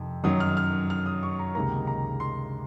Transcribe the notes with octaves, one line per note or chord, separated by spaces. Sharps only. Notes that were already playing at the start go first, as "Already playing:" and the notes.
Already playing: F2 C3 D#3
F#2 D#3 F#3 D#6
F6
F6
F6
D#6
C#6
A#5
C#2 C3 D#3 A#3 A#5
A#5
C6